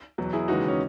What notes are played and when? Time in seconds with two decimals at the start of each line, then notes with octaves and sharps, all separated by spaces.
0.18 E2 B2 F#3
0.33 E4 G#4
0.48 D#2 C#3 E3 G#3 D#4 F#4
0.68 C#4